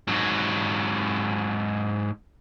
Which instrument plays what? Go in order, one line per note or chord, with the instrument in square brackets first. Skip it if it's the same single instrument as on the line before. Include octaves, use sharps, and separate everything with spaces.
[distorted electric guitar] G#2 F#3